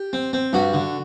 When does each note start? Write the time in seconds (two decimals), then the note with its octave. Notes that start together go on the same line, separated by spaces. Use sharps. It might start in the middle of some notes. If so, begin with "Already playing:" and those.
Already playing: G4
0.13 C4
0.33 C4
0.53 G2 F#4
0.74 D3